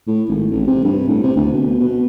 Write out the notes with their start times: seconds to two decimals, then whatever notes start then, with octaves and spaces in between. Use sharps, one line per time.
0.07 A2
0.28 G#1
0.51 A1
0.67 C3
0.84 G2
1.08 A2
1.23 C3
1.36 D2
1.53 B2
1.80 B2